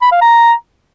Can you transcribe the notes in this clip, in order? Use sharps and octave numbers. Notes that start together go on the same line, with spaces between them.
B5
F5
A#5